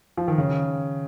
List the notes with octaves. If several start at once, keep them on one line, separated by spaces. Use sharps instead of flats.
F3
D#3
C#3